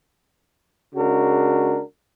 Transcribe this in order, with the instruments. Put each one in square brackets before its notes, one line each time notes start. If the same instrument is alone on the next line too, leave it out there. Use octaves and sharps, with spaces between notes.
[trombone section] C#3 G#3 D4 F#4 A#4